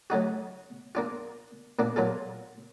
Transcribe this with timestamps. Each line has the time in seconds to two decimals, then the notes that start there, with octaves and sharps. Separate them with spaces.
0.10 F#3 A3 D#4 F#4
0.95 A#3 D4 F4
1.79 A#2 A#3 D4
1.96 A#2 F#3 F4 A4